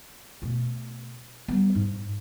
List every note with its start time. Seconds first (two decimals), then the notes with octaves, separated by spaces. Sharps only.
0.42 B2 A3
1.48 G3 B3
1.75 G#2